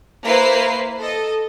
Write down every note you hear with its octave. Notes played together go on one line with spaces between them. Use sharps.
A#3 E4 B4 C5 C7
A4 D#5